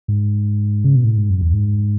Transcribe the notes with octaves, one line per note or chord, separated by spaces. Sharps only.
G#2
C#3
B2
A2
G#2
F#2
E2
G#2